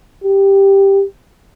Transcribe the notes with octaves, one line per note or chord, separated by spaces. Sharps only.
G4